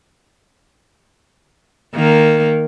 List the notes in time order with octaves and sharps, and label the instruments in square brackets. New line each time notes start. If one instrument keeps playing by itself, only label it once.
[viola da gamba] D#3 A#3